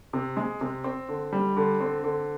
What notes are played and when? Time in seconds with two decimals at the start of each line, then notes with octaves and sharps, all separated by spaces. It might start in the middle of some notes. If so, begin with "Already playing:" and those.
0.13 C3
0.37 G#3
0.61 C3
0.84 C4
1.09 D3
1.32 G3
1.57 D3
1.80 C4
2.04 D3